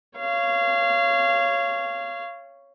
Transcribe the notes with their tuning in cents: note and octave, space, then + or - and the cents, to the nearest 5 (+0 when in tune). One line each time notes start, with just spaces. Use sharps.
C#5 +0 F5 -25